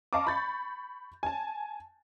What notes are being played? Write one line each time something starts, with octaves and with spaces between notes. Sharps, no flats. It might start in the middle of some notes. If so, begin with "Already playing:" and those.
D#5 F5 A5 A#5 C#6 D6
B5 C#6 G6 A6
G#5 A5